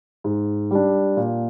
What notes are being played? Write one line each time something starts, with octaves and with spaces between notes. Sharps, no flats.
G#2
G3 D4
A#2